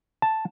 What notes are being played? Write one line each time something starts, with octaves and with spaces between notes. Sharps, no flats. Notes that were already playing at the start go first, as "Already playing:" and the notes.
A5